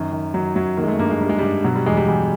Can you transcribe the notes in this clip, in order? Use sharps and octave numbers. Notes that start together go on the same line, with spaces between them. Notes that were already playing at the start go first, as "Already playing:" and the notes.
Already playing: F#2 D#3
D#3
D#3 F#3
F#2 F#3
D#3 A#3
G#3
A3
G2 A#3
G#3
G2 G3
G#3
G2 G3
B2 F#3
G3
E2 G#3
G3
E2 G3